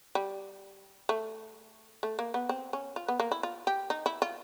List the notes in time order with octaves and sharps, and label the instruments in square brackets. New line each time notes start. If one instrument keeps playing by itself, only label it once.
[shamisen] G3
A3
A3
A#3
B3
C4
C#4
F4
B3
A#3
E4
F4
G4
D#4
E4
F4